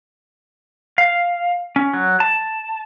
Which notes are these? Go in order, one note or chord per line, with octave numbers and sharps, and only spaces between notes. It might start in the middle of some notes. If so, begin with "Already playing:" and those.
F5
C#4
F#3
A5